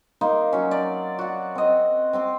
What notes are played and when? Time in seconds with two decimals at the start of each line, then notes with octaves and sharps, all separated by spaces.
0.21 A#3 D#4 C6
0.53 F#3 C#4
0.71 D5
1.19 F#4 F#5
1.55 C4 D#5
2.13 C4 C6 D6